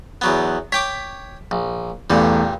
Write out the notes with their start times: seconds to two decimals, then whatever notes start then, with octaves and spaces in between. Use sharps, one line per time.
0.21 E2 F#3 B3
0.72 C#5 G5 D6 B6 D7
1.51 A#1
2.10 E2 G2 A#2 G3 A3